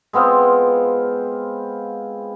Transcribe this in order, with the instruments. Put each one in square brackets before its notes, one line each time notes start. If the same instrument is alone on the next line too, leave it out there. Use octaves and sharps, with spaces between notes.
[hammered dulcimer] G#3 B3 C4 F4